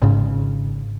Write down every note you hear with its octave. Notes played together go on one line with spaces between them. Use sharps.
G#1 G#2 C#3